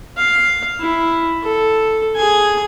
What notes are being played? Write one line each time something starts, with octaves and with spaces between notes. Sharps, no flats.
F5
E4
A4
G#4 G#5